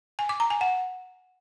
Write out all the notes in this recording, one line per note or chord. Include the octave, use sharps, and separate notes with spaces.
G#5
D6
A#5
G#5
F#5